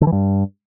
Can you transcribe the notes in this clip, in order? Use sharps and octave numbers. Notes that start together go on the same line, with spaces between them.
D3
E3
G2